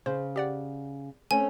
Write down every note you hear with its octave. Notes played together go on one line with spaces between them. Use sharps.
C#3 C5
G4 D5 F#5
A3 C4 C#4 G#5